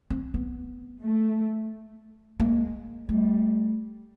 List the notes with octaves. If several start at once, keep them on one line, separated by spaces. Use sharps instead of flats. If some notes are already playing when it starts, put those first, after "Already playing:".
C4
B3
A3
G#3 A#3
G3 A3